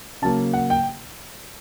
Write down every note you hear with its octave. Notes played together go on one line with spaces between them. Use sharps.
C#3 F#3 A#3 A5
F#5
G5